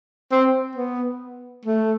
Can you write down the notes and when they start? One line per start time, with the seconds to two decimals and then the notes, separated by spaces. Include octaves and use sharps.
0.32 C4
0.76 B3
1.65 A3